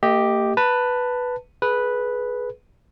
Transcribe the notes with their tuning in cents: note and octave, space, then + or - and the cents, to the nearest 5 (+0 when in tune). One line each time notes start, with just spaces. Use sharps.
A#3 -45 G4 +0 D#5 +10
B4 +0 A5 +20
G#4 +25 B4 -5